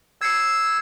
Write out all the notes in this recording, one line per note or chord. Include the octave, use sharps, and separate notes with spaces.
E6 G#6 C7 C#7